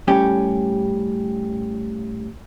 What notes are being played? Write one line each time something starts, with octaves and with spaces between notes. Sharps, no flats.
A2 G3 C#4 G4